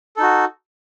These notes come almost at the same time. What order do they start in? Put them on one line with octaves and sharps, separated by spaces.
A4 D#4 F#4